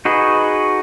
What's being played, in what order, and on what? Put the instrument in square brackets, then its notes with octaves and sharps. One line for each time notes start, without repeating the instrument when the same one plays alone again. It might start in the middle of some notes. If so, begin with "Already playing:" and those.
[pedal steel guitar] D#4 F#4 G#4 B4